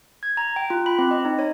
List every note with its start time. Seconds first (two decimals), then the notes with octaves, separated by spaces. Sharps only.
0.23 G#6
0.37 A#5
0.56 G5
0.70 F4
0.86 B5
0.99 C4
1.11 D#5
1.25 D#4
1.39 C#5